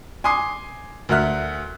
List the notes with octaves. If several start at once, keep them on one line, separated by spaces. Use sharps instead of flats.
G#5 C6 D6 D#6 C7
D2 A#4 E5 F#5 F6 F#6